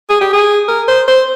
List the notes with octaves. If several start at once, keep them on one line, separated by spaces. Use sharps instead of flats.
G#4
G4
G#4
A#4
C5
C5